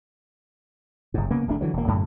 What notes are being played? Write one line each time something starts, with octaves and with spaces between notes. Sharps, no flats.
F#1 G#2
C#3 A#3 B3
D1 A#1 A3 D4
D3 E3 F#3
E1 A#3
F#2 A2 D3